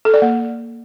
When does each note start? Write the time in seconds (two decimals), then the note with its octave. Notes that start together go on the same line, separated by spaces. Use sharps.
0.05 A4
0.14 D5
0.22 A#3